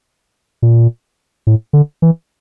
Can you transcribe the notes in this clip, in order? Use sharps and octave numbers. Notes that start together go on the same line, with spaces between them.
A#2
A2
D3
E3